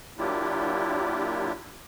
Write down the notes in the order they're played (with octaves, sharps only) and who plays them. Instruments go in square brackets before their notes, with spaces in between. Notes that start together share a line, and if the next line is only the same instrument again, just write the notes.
[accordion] F#3 A#3 D4 E4 F4 G4